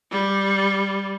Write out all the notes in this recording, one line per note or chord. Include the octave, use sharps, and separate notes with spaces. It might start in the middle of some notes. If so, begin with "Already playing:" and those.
G3